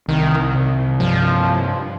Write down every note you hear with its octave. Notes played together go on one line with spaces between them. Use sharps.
C2 D#3
C3
G2 F3